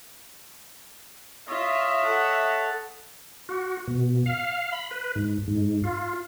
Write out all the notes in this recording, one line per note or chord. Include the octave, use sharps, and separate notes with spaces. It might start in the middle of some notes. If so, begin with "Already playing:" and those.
F4 C#5 D#5 E5
A4 F#5 A5
F#4
B2
F5
B5
B4
G#2
G#2
F4